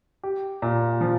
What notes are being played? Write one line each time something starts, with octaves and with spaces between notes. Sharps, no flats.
G4
A#2
F3